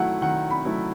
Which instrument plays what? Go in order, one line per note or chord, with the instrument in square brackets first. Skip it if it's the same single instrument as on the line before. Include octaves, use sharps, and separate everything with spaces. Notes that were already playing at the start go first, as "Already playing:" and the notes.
Already playing: [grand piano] D#3 F#3 A3 E4 [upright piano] F#5
[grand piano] D#3 [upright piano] F#5
[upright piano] B5
[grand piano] F#3 A3 E4